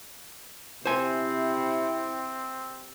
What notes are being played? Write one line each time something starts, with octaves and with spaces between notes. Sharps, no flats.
C3 C4 E4 C5 G#5